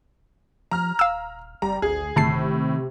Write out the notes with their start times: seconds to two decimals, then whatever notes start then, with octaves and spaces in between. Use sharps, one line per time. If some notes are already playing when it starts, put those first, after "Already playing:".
0.71 F3 A#5 F6
0.99 D#1 F5 E6
1.62 F#1 G3 A#5
1.82 G#1 D2 G#4
2.16 G1 A2 C3 D#3 A5 C7